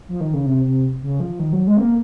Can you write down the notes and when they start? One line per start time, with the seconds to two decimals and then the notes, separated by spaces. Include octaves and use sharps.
0.08 F3
0.21 D#3
0.33 C#3
0.46 C3
0.64 C3
1.02 C#3
1.20 F3
1.39 D#3
1.53 F#3
1.67 G#3
1.77 C4
1.80 A#3